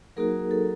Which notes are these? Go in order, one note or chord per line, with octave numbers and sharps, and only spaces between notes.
F#3 A#3 D#4 F#4 G#4 A#4
A4